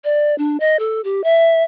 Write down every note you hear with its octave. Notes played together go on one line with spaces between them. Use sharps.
D5
D4
D#5
A4
G4
E5